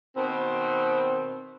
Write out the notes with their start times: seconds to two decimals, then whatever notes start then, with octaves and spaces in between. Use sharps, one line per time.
0.16 B2 D#3 C4